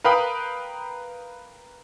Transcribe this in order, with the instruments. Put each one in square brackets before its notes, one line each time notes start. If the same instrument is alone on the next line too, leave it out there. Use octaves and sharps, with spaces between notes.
[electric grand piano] A#4 B4 F5 G5 B5 D#6